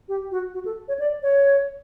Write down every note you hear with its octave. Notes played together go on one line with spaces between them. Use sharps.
G4
F#4
F#4
A4
C#5
D5
C#5